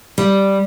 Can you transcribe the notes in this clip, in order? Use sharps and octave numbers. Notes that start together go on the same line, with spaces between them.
G3